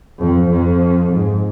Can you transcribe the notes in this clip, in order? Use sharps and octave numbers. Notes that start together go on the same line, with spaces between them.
F2
F2
G#2